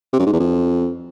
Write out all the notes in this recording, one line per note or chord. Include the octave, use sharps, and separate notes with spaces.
C3
F#2
G#2
E2
F2